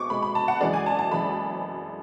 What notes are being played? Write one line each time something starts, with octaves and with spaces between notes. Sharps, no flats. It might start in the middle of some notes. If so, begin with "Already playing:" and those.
Already playing: B2 G#3 C#6 D6
B2 G#3 B5
B5
A5
F#5
F#2 E3 G#3 D5
G#5
A5
A5
F#2 E3 G#3 B5